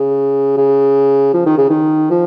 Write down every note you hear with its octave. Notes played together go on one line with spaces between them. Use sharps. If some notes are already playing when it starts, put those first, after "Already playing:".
Already playing: C#3
C#3
F3
D#3
C#3
D#3
F3